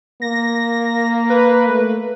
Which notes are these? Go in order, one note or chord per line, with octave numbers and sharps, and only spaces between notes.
A#3 A#6
B4
A3